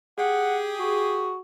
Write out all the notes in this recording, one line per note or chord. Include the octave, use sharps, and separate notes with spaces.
G4 G#4 F#5
F#4